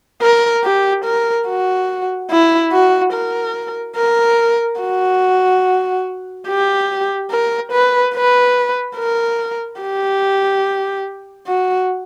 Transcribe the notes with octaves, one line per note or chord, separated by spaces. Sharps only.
A#4
G4
A#4
F#4
E4
F#4
A#4
A#4
F#4
G4
A#4
B4
B4
A#4
G4
F#4